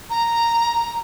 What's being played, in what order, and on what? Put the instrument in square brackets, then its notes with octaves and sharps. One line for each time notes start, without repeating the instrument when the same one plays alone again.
[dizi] A#5